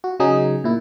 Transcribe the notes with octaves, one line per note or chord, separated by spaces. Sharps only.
F#4
C#3 F#3 D#4 G#4
A#2 E4